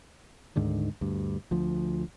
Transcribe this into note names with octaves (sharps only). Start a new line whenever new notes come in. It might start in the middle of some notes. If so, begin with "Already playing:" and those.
D2 G#2 D3 D#3
D2 G2
D2 F3